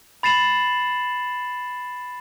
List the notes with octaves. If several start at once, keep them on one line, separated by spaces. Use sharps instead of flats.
B5 A6 C7 E7 F#7